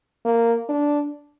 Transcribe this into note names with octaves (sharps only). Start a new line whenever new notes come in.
A#3
D4